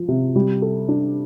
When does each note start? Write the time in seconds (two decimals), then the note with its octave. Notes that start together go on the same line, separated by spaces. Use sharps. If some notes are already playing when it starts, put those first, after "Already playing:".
Already playing: F3
0.08 C3
0.36 G3
0.62 A4
0.88 D4